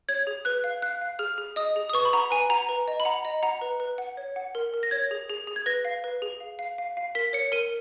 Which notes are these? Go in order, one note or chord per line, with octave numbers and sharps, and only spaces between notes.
C#5 G#6
G#4
B4 F#6
F5
F5 F#6
F5
G#4 F6
G#4
D#5 D#6
G#4
D#6
B4 C#6
B5
F#5 A#5
B4 G#5
F#5 A#5
B4
D#5
B5
F#5 A#5
D#5
F#5 A#5
B4
B4
F#5
C#5
F#5
A#4
A#4
A#6
C#5 G#6
G#4
G#4
G#4
G#6
B4 A#6
F5
B4
G#4
F5
F5
F5
F5
A#4 B6
C#5 C#7
A#4 D#7